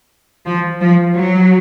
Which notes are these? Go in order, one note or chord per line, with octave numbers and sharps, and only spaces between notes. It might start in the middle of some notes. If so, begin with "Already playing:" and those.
F3
F3
F#3